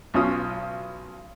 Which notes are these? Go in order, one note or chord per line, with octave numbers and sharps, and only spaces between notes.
B1 C#4 F4 D#6